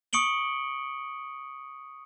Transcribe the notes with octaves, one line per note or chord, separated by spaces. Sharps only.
C#6 D#6 C#7 D7 F#7 G7